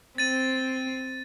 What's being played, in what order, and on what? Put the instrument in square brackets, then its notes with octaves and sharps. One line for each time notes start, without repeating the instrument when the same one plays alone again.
[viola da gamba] C4 [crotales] A6 D#7